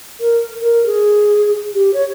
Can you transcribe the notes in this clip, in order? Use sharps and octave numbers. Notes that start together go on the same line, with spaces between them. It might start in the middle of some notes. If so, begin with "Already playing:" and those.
A#4
A#4
G#4
G4
C#5